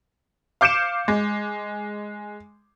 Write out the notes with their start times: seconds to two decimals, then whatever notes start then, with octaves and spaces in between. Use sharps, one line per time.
0.61 F5 D6 G6 C#7 D7 E7
1.08 G#3